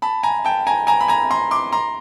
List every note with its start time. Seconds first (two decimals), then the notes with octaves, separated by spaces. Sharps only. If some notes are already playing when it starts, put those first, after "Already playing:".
0.02 A5 B5
0.23 G#5 A#5
0.45 G5 A5
0.67 G#5 A#5
0.87 G#5 A#5
1.01 B5
1.08 G#5 A#5
1.31 A#5 C6
1.51 C6 D6
1.72 A#5 C6